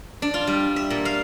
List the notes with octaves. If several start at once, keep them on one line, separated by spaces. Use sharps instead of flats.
D4
F4
G3
E5
A#2
F5